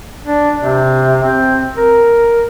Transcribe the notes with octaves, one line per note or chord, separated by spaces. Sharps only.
D4
C3
C4
A#4